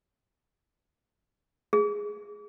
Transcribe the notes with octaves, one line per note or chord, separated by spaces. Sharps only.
G#4